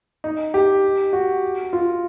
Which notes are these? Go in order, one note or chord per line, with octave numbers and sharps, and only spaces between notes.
D#4
G4
F#4
F4